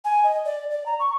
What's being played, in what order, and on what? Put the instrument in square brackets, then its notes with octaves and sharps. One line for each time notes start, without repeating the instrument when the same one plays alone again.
[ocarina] G#5
D#5
D5
D5
A#5
C#6